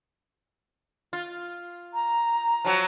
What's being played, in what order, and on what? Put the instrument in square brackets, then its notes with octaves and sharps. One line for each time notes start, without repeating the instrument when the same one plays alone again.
[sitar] F4
[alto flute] A#5
[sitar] F3 F#3